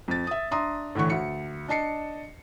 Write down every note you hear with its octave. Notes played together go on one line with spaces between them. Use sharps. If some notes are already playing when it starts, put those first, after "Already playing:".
F2 A6
E5 D#6
D4 E5 A#5 C6 D#6
A2 D3 E3 F#5 C#6
D2 C#7
D4 D#5 A5 C7 C#7